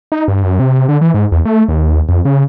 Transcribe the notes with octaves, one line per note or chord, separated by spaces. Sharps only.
D#4
G2
F#2
C3
D3
E3
G#2
E2
A3
D#2
F2
C#3